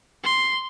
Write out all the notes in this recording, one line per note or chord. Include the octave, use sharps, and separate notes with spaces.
C6